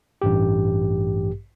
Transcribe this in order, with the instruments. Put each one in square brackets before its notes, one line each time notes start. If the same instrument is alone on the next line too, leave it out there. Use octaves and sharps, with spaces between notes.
[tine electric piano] A1 G2 G4